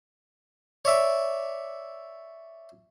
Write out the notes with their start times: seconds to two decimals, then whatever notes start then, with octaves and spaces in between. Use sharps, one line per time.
0.85 C#5 D5 E5 D6